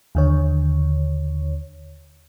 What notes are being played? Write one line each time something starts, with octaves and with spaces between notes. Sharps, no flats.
D#2 D3 C#5